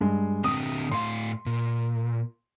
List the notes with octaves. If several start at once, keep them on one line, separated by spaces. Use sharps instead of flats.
G2 G#3
D3 C4 D#6
A2 F5 C6
A#2